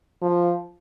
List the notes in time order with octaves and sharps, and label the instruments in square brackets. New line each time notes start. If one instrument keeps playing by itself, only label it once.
[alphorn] F3